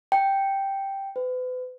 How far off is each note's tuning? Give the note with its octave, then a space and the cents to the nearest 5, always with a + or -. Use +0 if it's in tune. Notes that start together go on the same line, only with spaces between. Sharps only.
G5 +0
B4 +40